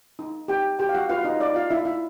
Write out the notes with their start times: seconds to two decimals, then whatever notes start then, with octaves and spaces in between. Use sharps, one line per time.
0.19 D#4
0.48 D#4 G4 G5
0.79 F#4 G4 G5
0.89 F5
0.94 F#4 F#5
1.09 F4 B4 F5
1.24 D#4 D#5
1.40 D#4 D5
1.55 F4 F5
1.70 D#4 E4 E5
1.85 E4 E5